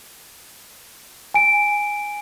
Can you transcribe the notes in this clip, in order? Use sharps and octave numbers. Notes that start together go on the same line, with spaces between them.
G#5 D7